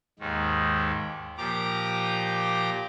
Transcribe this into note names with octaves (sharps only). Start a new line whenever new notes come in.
D#2 G#2 D#3
A#2 F3 G4 A#5 D6